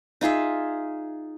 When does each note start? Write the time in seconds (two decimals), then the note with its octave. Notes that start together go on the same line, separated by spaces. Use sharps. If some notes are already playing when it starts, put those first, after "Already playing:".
0.21 D#4 F4 G#4 E5